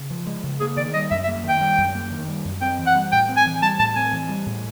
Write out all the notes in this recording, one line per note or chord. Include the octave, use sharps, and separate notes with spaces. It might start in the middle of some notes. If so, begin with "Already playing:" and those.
Already playing: C#3
F3
G#3
C#3
A#3 G#4
D#3 D5
G3 D#5
F#2 E5
E5
A#3
D#3 G5
G3
F#2
A#3
D#3
G3
F#2
C4 G5
E3
F#5
G3
A2 G5
C4
G#5
E3
G3 A5
A2 A5
C4 G#5
E3
G3
A2